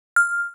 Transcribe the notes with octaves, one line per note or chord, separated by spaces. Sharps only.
F6